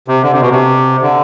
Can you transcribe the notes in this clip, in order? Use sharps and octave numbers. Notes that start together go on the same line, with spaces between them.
C3
D3
C3
B2
C3
D3